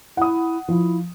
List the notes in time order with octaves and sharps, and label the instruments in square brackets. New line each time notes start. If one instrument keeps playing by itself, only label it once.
[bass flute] E4 [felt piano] F#5 D#6
[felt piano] F3 [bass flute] E4